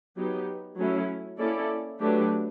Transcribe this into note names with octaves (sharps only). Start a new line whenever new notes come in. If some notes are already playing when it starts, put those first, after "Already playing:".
F#3 B3 D#4 G4
F#3 A3 C#4 E4
A#3 C#4 E4 A4 D5
F#3 A3 D4 G4 B4